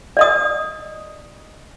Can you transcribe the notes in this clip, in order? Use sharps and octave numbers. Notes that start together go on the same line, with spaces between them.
D5 D#5 D#6